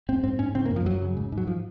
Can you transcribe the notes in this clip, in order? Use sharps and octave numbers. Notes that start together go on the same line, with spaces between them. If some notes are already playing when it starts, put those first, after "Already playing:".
G#2 C4
G#2 C4
G#2 C#4
C#3 C4
A#3
F#2
F3
F#2 F#3
C#3
G#2
G#2
F#3
F3